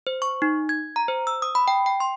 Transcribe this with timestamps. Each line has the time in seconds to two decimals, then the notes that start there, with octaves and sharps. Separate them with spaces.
0.07 C5
0.22 C#6
0.42 D#4
0.69 G#6
0.96 A#5
1.08 C5
1.27 E6
1.42 D#6
1.55 B5
1.68 G5
1.86 G5
2.00 C6